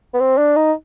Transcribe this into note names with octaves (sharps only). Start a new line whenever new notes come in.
B3
C4
D4
D#4